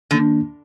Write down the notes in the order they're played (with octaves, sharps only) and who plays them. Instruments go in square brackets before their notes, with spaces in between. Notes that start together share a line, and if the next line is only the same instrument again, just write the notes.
[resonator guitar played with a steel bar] D3 [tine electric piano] D#3 A#3 D4